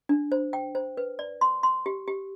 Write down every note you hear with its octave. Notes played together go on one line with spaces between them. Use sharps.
D4
C5
G5
C5
B4
D5
C6
C6
G4
G4